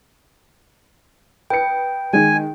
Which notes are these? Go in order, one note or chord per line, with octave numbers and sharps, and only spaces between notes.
B4 G5 C#7
D#3 G#3 G#5